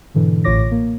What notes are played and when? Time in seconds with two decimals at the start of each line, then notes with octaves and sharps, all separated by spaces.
0.14 G#2 B2 D3 E3
0.44 A1 A2 F4 C#5 D6 A#6
0.71 A#3